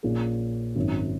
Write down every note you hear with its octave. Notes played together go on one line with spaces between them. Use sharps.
A#1 A#2 A#3 C#4 G#4
G#1 F#2 F#3